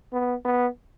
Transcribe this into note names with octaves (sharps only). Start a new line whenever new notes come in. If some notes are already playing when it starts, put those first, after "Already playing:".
B3
B3